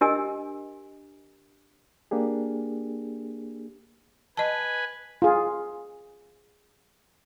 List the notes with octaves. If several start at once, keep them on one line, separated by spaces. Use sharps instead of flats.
D4 G4 A#4 D#5 G#5 E6
A#3 D4 G4 G#4
B4 D#5 G#5 A5
F4 G#4